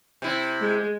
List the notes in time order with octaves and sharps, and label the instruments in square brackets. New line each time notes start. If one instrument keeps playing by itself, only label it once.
[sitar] C3 E4
[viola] G#3